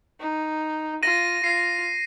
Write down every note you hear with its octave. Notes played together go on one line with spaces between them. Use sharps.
D#4
F4 A#6 D#7
F4 C7